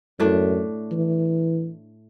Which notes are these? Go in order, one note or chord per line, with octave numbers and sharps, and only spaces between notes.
F#2 A2 A3 D4
E3